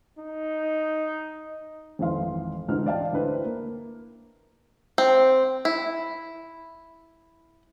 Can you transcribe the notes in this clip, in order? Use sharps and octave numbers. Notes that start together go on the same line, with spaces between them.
D#4
G#1 F2 E3 F5 C6
D2 G#2 E3 F6
D5 D#5 F5 G5 A5
D2 E4 B4 C5
A#3
C4
E4